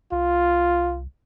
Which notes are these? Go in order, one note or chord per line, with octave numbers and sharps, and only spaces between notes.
C2 F4